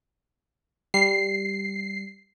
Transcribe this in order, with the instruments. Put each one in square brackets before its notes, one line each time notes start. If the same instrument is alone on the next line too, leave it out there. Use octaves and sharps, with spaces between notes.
[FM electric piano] G3 [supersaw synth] C7